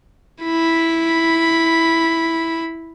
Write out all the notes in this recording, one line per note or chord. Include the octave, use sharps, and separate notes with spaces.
E4 B5